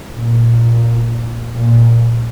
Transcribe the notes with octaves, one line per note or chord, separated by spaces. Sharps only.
A#2
A#2